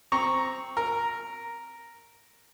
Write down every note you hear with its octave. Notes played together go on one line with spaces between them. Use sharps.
C4 A#5 C#6
A#4